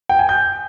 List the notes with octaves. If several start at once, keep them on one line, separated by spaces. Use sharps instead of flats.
G5
G#5
G6